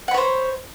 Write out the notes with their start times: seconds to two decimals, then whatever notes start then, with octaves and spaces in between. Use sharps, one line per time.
0.08 F#5
0.11 B5
0.14 C#5
0.18 C5